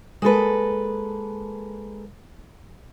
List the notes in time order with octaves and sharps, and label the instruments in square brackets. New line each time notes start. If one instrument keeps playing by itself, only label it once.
[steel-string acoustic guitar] G#3 A#3 A4 B4